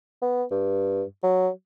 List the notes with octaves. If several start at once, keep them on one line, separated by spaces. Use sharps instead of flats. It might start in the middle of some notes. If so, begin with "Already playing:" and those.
B3
G2
F#3